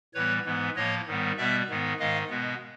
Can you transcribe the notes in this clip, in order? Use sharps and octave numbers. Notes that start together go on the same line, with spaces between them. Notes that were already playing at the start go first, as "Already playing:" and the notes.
A2 E3 G3 B3 B4 C#5
G#2 E3 G#3 B3
A2 F3 A#3 C#5 D#5
G#2 D#3 G3 B3
B2 G3 B3 D5 E5
G#2 D#3 G#3 B3
G#2 D#3 G#3 D#5 F5
B2 G#3 B3